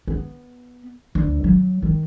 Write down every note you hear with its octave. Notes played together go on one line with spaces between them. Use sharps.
B3
D2
F#3
D#3